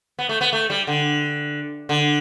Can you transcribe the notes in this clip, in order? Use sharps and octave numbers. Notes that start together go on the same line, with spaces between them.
B3
A3
B3
A3
G3
D3
D3